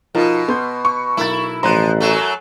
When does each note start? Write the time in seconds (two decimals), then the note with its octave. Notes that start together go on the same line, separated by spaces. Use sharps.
0.15 B2 F3 D#4 F4 A#4
0.48 B3 C6 G6
0.85 C#6
1.17 B1 E4 A#4 A6
1.63 A1 F3 A#5 C6 F#6
2.00 F#2 F#3 A3